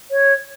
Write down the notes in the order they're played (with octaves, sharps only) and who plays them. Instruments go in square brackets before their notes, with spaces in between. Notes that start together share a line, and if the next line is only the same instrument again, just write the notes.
[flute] C#5